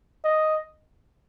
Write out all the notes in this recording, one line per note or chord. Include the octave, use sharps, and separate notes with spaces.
D#5